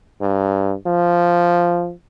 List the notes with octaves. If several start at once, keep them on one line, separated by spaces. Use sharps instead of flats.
G2
F3